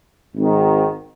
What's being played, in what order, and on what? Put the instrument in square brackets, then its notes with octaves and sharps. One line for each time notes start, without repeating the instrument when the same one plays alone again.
[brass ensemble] G#1 G#2 D#3